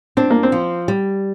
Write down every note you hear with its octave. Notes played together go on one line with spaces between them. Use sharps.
C4 D4
A#3
C4
F3
G3